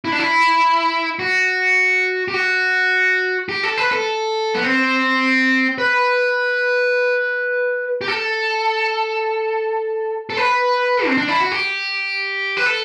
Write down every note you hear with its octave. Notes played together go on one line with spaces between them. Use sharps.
E4
D4
E4
F#4
G4
F#4
G4
A4
B4
A4
B3
C4
B4
G4
A4
A4
B4
C4
D4
E4
F#4
G4
B4
A4